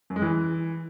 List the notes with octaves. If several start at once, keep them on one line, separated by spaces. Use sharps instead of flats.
F#2
G#3
E3